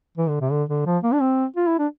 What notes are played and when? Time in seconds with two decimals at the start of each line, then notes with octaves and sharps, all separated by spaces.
0.17 E3
0.29 D3
0.41 C3
0.51 D3
0.69 D3
0.86 F3
1.03 A#3
1.13 D4
1.21 C4
1.56 F4
1.67 E4
1.79 D4